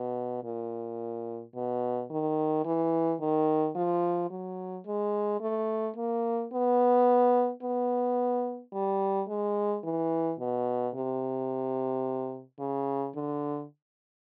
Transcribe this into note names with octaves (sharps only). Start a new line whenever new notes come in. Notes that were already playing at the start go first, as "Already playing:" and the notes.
Already playing: B2
A#2
B2
D#3
E3
D#3
F3
F#3
G#3
A3
A#3
B3
B3
G3
G#3
E3
B2
C3
C#3
D3